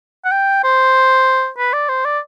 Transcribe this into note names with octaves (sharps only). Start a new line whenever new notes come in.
F#5
G5
C5
B4
D5
C5
D5